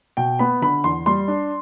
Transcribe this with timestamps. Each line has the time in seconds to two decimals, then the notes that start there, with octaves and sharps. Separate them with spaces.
0.17 B2 G5
0.39 B3 B5
0.62 D3 B5
0.84 E2 C6
1.06 G3 C6
1.28 D4